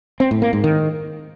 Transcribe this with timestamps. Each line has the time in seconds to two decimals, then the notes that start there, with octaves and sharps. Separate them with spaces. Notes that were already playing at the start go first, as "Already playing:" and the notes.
0.20 C4
0.31 A2
0.42 A#3
0.53 G#2
0.64 D#3